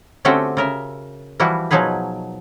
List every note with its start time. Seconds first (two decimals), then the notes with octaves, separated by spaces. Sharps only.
0.25 D3 A3 C4 C#4 F#4 G4
0.57 C#3 A#4 E5
1.40 E3 F3 G3 E4 F#4
1.71 B2 F3 F#3 D#4 G#4 B4